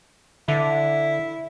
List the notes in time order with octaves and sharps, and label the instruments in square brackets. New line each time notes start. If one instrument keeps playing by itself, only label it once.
[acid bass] D3 [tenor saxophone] E4